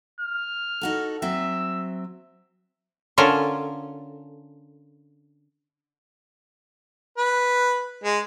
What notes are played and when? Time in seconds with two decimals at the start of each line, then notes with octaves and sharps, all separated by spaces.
0.21 F6
0.81 D#4 F#4 A4
1.22 F#3 C4 E5 E6
3.18 D3 C#4 F4 A4 A#4 A#5
7.18 B4
8.04 G#3